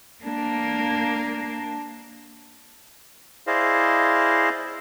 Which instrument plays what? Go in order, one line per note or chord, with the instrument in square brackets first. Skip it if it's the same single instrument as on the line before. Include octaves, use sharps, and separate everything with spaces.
[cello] A#3 [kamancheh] D4
[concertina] E4 G#4 C5 D5 D#5 F5